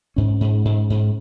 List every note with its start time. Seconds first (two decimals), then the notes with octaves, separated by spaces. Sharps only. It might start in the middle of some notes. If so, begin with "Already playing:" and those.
0.16 G#2 C#4
0.41 G#2
0.65 G#2
0.90 G#2